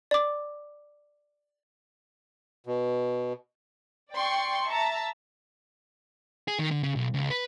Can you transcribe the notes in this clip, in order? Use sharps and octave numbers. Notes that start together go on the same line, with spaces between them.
D5 D6
B2
D5 G5 C6 C#6
E5 A5 A#5
G#4
D#3
D3
C#3
B1
C#2
B4